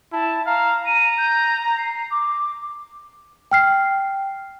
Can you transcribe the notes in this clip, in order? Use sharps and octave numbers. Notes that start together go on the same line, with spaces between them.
E4 A5
F5 A#5
A#5 D#7
G6
C7
D6
G5 F6 C7